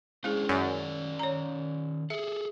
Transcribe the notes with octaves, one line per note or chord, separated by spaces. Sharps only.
G#3 C#4 D4 E4 G#4 C5
F#2 D#3 C#4 D5
C#5 A#5
G#4 A4 E5